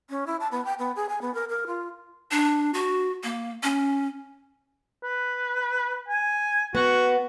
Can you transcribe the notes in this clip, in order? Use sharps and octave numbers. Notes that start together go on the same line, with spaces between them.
C#4
E4
A5
B3
G5
B3
G#4
G#5
B3
A#4
A#4
F4
D4
F#4
A#3
C#4
B4
G#5
B3 F#4